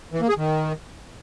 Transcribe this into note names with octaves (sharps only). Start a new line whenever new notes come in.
E3
A#3
G#4
D#3